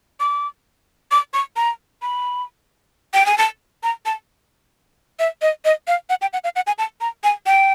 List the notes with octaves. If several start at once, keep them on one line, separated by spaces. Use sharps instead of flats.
D6
D6
C#6
A#5
B5
G5
G#5
A5
A#5
A5
E5
D#5
D#5
F5
F#5
G5
F#5
F5
F#5
G#5
A5
A#5
G#5
G5